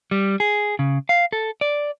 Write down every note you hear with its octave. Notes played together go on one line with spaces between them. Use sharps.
G3
G#4
C#3
F5
A4
D5